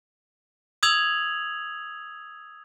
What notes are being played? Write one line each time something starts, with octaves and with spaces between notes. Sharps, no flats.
D#6 E6 G#6 F7 F#7